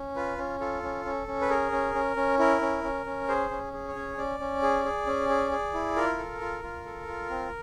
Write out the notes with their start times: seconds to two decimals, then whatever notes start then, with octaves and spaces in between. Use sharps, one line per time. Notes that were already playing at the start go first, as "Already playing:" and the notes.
Already playing: C#4
0.16 F4 B4
0.38 C#4
0.60 F4 A4
0.83 C#4
1.05 C#4
1.28 C#4
1.41 B4
1.49 G#4 A#4
1.72 C#4
1.95 C#4
2.16 C#4
2.39 E4 A#4
2.61 C#4
2.84 C#4
3.06 C#4
3.28 G#4 C5
3.51 C#4
3.73 G#4
3.88 C#5
3.96 C#4
4.18 C#4 D5
4.40 C#4
4.62 G#4
4.85 G#4
5.07 C#4
5.29 G#4
5.51 G#4
5.74 E4
5.96 F4 A#4
6.19 A4
6.41 F4
6.63 F4
6.86 A4
7.08 F4
7.30 C4